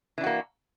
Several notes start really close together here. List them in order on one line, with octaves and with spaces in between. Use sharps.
E3 D4 F#4 A#3